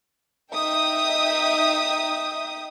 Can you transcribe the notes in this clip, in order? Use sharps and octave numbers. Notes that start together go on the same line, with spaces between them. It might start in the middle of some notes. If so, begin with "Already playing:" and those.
D#4 E5 G5 D#6